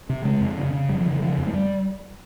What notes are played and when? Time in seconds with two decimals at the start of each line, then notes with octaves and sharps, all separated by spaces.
0.10 C3
0.25 C#3 G#3
0.41 F2
0.57 C#3
0.73 C#3
0.89 F2 G3
1.01 F3
1.06 C#3 E3
1.22 C#3 F3
1.38 F2
1.47 G#3
1.54 G3